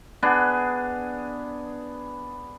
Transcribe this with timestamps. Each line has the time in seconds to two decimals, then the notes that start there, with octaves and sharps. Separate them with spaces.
0.23 B3 D4 G#4